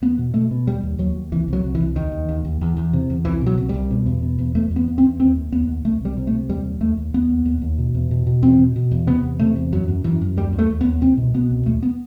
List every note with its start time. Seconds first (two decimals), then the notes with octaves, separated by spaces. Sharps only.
0.02 E2 B3
0.18 B2
0.34 B2 A3
0.51 B2
0.67 D#2 G3
0.83 D#2
0.98 D#2 F#3
1.15 D#2
1.32 C2 E3
1.48 C2 F#3
1.64 C2
1.75 E3
1.80 C2
1.96 D#2 D#3
2.12 D#2
2.29 D#2
2.45 D#2
2.61 E2
2.77 E2
2.93 C3
3.10 E2
3.25 C2 E3
3.41 B2
3.46 F#3
3.58 C2
3.69 C2 G3
3.90 B2
4.06 E2
4.22 B2
4.39 E2
4.55 E2 A3
4.71 E2
4.76 B3
4.88 E2
4.98 C4
5.03 E2
5.20 D#2 C4
5.36 D#2
5.52 D#2 B3
5.68 D#2
5.85 C2 A3
6.01 C2 G3
6.17 C3
6.27 A3
6.33 C3
6.49 D#2 G3
6.64 D#2
6.80 D#2 A3
6.97 D#2
7.14 D#2 B3
7.30 D#2
7.46 D#2
7.62 D#2
7.78 B2
7.94 E2
8.11 B2
8.27 B2
8.42 E2 C4
8.59 B2
8.76 B2
8.91 E2
9.07 C3 B3
9.23 E2
9.39 C3 A3
9.56 E2
9.72 F#2 F#3
9.88 F#2
10.04 F#2 E3
10.21 F#2
10.36 D#2 G3
10.53 D#2
10.59 A3
10.70 D#2
10.81 B3
10.85 D#2
11.01 C2 C4
11.17 B2
11.34 B2 B3
11.50 C2
11.66 D#2 A3
11.83 B3